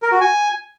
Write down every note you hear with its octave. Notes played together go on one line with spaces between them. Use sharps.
A#4
F#4
G#5